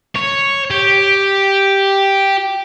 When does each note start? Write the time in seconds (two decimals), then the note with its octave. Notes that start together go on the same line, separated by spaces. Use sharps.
0.15 C#5
0.71 G4